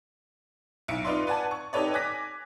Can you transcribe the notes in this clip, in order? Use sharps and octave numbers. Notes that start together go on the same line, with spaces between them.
B1 E4 C#7 D7
D#4 F4 B4 D5 C6
B4 D5 F#5 G#5 A5
C#6
D#4 G4 A4 B4 C#5 D5
G#5 D6 F#6 A#6 B6